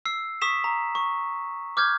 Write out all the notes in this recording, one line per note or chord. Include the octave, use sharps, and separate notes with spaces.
E6 C7
C#6 D#6 B6 E7
A#5
C#6
D6 F6 G6 G#6